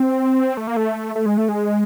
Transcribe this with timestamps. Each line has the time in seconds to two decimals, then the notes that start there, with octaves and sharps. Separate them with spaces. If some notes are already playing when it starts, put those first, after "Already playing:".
Already playing: C4
0.57 A3
0.67 A#3
0.77 A3
1.15 A3
1.26 G#3
1.38 A3
1.49 G#3